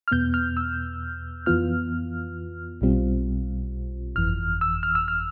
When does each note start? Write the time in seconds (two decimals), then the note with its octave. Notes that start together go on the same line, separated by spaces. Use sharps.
0.08 F6
0.11 E2 B2 B3 G6
0.34 F6
0.57 E6
1.46 F2 E3 B3 F4 F6
2.81 B1 B2 G3 C4 F4
4.16 G1 F2 E3 F6
4.61 E6
4.83 F6
4.95 E6
5.08 F6